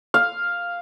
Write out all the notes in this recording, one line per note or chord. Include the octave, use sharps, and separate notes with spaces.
F5